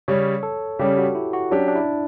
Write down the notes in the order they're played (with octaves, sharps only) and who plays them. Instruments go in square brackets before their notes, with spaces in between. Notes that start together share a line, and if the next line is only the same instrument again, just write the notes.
[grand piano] C#3 G3 C#4 [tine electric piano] C#5
[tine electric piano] A4
[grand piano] C#3 G3 C#4 [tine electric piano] G4
[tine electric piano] F#4
E4
F#4
[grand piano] F#3 C#4 G4 [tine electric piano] D4
[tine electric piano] D4
E4